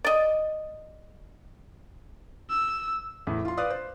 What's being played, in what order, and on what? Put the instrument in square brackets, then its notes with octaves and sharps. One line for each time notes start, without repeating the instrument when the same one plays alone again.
[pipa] D5 D#5
[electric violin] E6
[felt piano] E2 A2
F4 C6
B4 D5 F5 D#6 F#6
C5